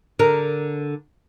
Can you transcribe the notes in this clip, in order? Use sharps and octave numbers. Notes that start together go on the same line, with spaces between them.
D3 A#4